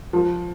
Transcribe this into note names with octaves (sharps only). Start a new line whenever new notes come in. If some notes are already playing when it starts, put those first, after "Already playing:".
F3